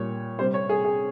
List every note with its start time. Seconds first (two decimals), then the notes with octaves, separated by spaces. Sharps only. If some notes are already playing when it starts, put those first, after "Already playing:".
Already playing: A#2 G3 C#5
0.39 C3 G3 C5
0.54 C#5
0.69 G#4
0.85 G#4